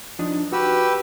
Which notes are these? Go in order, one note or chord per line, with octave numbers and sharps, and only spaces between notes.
F3 D4 D#4
F#4 G4 B4 E6